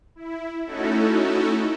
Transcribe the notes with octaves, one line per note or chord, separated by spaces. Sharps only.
E4
A3 C#4 D#4 E4 F#4 A4